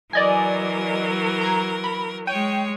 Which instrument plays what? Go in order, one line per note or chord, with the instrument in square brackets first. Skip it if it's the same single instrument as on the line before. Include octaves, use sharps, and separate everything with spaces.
[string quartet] E3 F#3 A#4 [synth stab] D5 D#5 G#5
[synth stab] A#5 G#6 C7
B5
[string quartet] G#3 C#5 [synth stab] G5 D#7